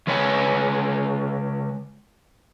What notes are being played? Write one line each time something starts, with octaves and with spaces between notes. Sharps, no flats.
C#3 G#3 B4 C#5 D#5 G#5